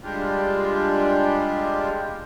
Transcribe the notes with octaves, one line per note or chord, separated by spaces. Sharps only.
G3 G#3 D4 F4 G4